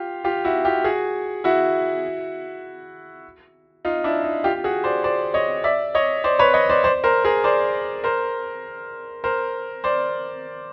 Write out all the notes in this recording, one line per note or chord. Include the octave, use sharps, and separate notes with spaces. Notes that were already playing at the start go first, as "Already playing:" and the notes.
Already playing: F4 G4
F4 G4
E4 F#4
F4 G4
F#4 G#4
E4 F#4
D#4 F4
D4 E4
D#4
F4 G4
F#4 G#4
C5 D5
C5 D5
C#5 D#5
D5 E5
C#5 D#5
C5 D5
B4 C#5
C#5 D#5
C5 D5
C5 D5
A#4 C5
G#4 A#4
C5 D5
A#4 C5
A#4 C5
C5 D5